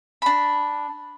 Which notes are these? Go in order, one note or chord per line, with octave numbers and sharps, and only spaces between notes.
D4 B5